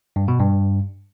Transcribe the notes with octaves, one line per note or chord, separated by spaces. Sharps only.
G2
B2
G2